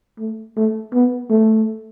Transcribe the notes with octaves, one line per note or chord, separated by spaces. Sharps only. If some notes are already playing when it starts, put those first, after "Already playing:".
A3
A3
B3
A3